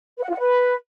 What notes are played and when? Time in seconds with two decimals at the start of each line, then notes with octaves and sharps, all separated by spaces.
0.18 B4
0.23 F#5
0.28 F4
0.34 F#5
0.39 B4